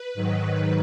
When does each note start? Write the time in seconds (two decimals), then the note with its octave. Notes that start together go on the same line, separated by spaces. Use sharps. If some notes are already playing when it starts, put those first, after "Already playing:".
Already playing: B4
0.14 G#2 D#3 F#3